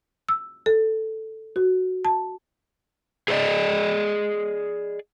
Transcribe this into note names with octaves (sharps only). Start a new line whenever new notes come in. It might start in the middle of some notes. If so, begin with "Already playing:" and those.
E6
A4
F#4
A5
G#4 A#4 C5 D5 D#5